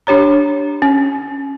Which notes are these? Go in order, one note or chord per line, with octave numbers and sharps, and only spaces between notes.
D4 G4 C#5 A#5
C#4